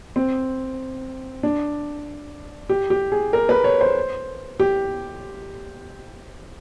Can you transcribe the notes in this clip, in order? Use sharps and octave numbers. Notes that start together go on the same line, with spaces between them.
C4
D4
G4
G4
G#4
A#4
B4
C#5
C5
G4